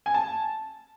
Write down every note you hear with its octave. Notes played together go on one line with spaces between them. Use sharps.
G#5
A5